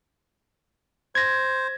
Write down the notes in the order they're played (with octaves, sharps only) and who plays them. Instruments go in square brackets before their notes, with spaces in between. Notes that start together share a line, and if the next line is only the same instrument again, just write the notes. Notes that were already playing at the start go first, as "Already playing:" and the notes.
[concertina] C5 [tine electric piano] G#6 A#6